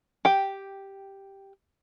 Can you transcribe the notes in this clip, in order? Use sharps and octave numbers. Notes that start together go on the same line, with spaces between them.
G4 G5